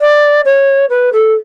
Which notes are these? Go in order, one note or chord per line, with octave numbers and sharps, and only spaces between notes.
D5
C#5
B4
A4